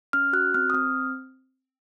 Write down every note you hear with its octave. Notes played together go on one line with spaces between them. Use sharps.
C#4 F6
F#4 F#6
C4 F6
D#6
C4 F6